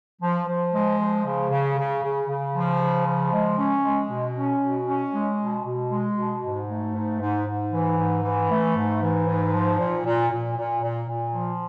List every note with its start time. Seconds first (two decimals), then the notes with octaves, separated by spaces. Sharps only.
0.22 F3
0.47 F3
0.73 G#3
0.99 F3
1.25 C#3
1.50 C#3
1.77 C#3
2.03 C#3
2.29 C#3
2.54 F3
2.81 C#3
3.06 F3
3.33 G#3
3.59 C#4
3.84 G#3
4.10 B2
4.35 C#4
4.62 B2
4.87 C#4
5.13 G#3
5.39 B2
5.64 B2
5.91 G#3
6.17 B2
6.43 G#2
6.69 A3
6.94 G#2
7.20 G#2
7.46 G#2
7.72 E3
7.98 G#2
8.24 E3
8.50 A3
8.75 G#2
9.02 E3
9.27 G#2
9.53 F3
9.79 A#2
10.05 A#2
10.31 A#2
10.57 A#2
10.82 A#2
11.08 A#2
11.34 F3